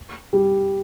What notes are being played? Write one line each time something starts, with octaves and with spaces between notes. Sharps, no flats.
G3